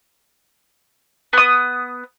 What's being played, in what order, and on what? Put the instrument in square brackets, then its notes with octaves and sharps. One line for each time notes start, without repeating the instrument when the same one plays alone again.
[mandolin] B3 D#6